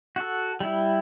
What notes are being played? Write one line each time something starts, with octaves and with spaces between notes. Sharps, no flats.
F#4 A4
G3 E4